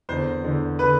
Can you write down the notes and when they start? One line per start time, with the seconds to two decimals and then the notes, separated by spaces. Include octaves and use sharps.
0.09 E2 D3 C5
0.44 E2 D3
0.79 D3 B4